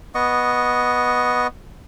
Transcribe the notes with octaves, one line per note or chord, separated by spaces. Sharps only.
B3 D#5 C#6